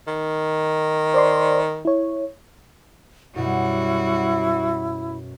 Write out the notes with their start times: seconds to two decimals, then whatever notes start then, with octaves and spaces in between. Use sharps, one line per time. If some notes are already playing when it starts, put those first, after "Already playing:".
0.07 D#3
1.14 C5 D5 C6
1.85 E4 C#5
3.36 F#2 B2 G3 E4 F#4